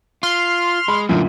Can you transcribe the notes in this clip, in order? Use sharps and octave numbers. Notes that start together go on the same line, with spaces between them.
F4 C6 F6
G#3 B5
F#2 A#2 D3 E3